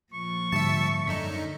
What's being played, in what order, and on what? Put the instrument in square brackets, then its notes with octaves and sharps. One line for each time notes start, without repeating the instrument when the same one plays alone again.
[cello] A#2 F3 [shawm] C#6
[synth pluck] G#2 D3 G3 [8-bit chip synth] E5 A5
[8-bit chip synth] F#2 D#4 [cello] D3 [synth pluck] B6 E7